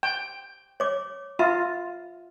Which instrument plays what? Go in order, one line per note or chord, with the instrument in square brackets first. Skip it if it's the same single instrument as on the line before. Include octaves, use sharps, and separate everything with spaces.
[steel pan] G5
[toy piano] C#5 D6
[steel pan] F4 [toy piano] E5